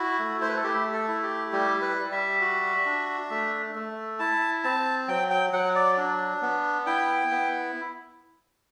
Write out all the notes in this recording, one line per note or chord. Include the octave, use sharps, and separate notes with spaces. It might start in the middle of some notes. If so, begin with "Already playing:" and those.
Already playing: E4 F#4
A3
C5
B4
A4
A3 G4
A4
E4
G4
G3 G4
B4
G3
E5
F#4
D4
A3
A3
E4 A5
C4 A5
F#3 G5
G5
F#3 F#5
D5
D4
B3
E4 G5
B3